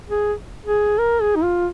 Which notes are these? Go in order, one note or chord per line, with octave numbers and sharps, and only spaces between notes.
G#4
G#4
A#4
G#4
D#4
F4